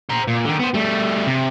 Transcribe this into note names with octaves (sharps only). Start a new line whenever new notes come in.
C5 A#5
A#2
D3 D#3
B3 C5
G3 A3
C3